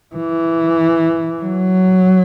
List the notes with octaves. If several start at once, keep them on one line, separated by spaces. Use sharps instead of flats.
E3
F#3